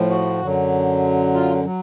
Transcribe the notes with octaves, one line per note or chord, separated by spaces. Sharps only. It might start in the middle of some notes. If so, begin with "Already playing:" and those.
Already playing: A2 F3
F#4
F#2 D3 F#3
F4
F#3